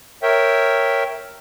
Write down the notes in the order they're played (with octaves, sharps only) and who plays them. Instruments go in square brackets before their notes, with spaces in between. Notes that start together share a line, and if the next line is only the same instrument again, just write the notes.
[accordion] A#4 C#5 E5 G5